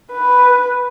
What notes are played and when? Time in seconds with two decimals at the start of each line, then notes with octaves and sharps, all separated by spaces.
0.12 B4